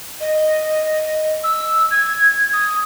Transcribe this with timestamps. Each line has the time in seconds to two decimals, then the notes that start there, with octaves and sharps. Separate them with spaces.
0.20 D#5
1.43 E6
1.90 G#6
2.53 D#6